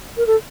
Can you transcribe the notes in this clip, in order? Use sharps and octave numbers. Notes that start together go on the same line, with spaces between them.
A#4
A4